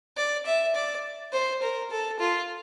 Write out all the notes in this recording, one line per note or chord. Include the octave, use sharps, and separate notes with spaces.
D5
E5
D5
C5
A#4
A4
F4